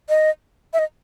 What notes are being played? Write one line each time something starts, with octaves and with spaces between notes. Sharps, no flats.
D#5
E5
D#5